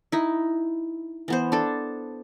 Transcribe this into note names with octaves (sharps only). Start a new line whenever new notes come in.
D#4 E4
E3 B3 C5
D4 A4